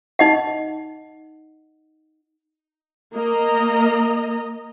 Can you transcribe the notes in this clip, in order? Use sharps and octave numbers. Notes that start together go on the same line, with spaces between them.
D#4 D#5 F#5
A#3 D#5 A#5